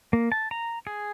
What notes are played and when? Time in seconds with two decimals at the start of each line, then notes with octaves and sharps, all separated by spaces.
0.13 A#3
0.32 A5
0.51 A#5
0.87 G#4